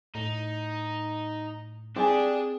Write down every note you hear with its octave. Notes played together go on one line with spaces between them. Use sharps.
A2 D#4
C4 D4 G4 G#4 D5 G#5